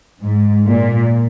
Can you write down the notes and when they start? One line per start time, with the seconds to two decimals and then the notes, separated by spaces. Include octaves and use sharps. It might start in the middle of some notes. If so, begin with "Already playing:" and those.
0.21 G#2
0.67 A#2